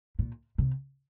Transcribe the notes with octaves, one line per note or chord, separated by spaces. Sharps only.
A#2
C3